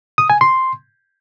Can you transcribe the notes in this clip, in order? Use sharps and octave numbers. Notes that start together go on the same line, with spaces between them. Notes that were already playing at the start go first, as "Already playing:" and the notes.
D#6
G#5
C6